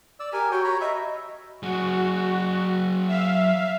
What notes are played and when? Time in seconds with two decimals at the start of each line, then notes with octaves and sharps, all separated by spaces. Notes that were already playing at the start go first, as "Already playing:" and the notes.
0.20 D5 E6
0.33 G4 A#4 G#5
0.52 F#4 C#5 G5
0.64 C#5 A#5 B5
0.81 D#5 E5
1.63 F#3 F#4 G#4
3.07 E5 F5